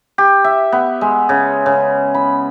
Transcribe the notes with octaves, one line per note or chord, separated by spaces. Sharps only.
G4
E5
B3
G#3
C#3
C#3
B5